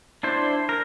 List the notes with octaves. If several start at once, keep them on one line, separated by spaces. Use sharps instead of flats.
D4 E4 C5
A#4